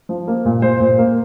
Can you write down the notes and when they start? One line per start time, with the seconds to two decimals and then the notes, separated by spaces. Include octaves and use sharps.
0.09 F3
0.27 A#3
0.45 A#2
0.62 A#2 C5
0.80 A#2
0.98 A#3